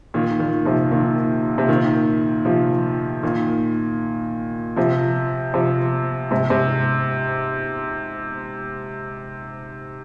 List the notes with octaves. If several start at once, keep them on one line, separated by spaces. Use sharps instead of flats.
A#2 D#3
A#2 D#3
C3 F3
A#2 D#3
C3
A#2 D#3
C3 F3
A#2 D#3
C3 F3
C3 F3
G#2 C3
G#2 C3